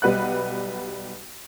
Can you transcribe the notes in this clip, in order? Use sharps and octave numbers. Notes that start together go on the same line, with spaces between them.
B1 G3 B4 F#5 F#6